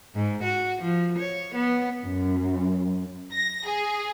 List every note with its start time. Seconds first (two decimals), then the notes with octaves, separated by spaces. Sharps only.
0.15 G#2
0.43 F#4
0.82 F3
1.19 C#5
1.55 B3
2.05 F#2
3.33 A#6
3.67 G#4